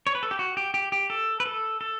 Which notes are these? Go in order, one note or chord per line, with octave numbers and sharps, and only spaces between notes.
C#5
B4
A4
G4
F#4
G4
G4
G4
A4
B4
A4
A4